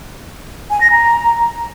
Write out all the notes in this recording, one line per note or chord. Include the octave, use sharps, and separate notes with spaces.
G#5
A#6
A#5